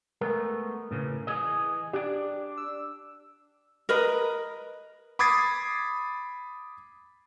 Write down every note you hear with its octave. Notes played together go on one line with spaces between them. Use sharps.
G#3 A3 B3 A#4
A2 C#3 E3
E3 G#4 D#5
D4 G4 D5
E6
A#4 B4 D#5
B5 D6 D#6 G#6 A6 C7